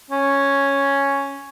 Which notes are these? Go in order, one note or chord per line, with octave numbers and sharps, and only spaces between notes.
C#4